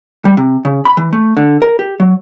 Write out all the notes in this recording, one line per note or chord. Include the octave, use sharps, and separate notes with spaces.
G3
C3
C#3
B5
E3
A3
D3
A#4
G4
F#3